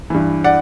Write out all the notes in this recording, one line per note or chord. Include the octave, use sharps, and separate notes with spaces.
G2 E3
D5 F#5